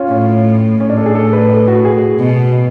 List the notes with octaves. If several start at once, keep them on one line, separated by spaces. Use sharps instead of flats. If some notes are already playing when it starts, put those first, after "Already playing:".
Already playing: C#4 F4
A2 C#4
A2 C#4
D4
A4
G#4
A4
B4
A4
F#4
G#4
B2